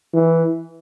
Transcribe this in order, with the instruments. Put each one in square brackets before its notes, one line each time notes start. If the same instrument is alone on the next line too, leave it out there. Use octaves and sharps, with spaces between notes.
[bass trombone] E3